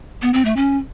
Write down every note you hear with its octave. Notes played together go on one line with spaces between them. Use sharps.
B3
C4
A3
C#4